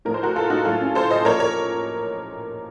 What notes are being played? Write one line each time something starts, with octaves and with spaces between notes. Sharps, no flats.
A2 F3 A#4
C5
F#4 A#4
F4 A4
D#4 F#4
A2 F#3 F4 A4
C#4
A4 C5
C5 D#5
A#2 F3 A#4 C#5
A#4 C#5